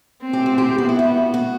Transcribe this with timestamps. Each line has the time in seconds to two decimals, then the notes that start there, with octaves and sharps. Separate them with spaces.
0.22 C4
0.33 G4
0.46 F#4
0.58 G4
0.77 B3 F#4
0.89 E4
0.99 F#4
1.34 F#4